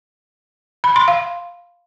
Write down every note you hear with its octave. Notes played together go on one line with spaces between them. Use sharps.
B5
C6
F5